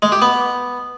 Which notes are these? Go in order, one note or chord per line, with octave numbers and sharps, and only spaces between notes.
G#3
G4
B3